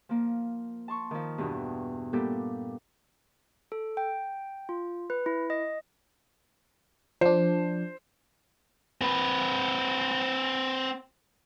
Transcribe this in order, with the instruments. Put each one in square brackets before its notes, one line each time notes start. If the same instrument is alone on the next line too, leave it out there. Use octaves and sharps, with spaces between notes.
[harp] F3 A#3
A5 C6 C#6
D#3 F3
E2 G2 B2
A#2 G3 B3 G4 A4 G6
[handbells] A4
G5
F4
B4
E4
D#5
[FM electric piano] F3 D4 [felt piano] C5
[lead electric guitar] C4 B4